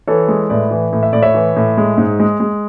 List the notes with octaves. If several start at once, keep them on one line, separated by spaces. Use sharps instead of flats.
E3 A4 C#5
G#3
A2 B4 D5
E3
A2
E5
A2 D5
C#5 E5
E3
A2
G#3
G#2
G#3
G#3